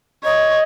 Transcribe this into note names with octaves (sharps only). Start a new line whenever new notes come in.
C#5 D#5